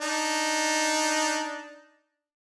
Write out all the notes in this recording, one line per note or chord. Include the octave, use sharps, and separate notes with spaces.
D4 D#4